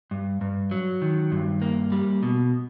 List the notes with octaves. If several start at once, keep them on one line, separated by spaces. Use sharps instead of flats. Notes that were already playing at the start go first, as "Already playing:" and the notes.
G2
G2
F#3
D#3
G2
A#3
G3
B2